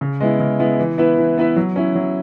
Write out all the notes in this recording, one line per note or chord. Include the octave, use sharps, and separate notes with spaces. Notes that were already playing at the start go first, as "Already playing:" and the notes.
C#3
G#3 B3 E4
C#3
G#3 B3 E4
E3
B3 E4 B4 E5
E3
B3 E4 B4 E5
F#3
C#4 E4
F#3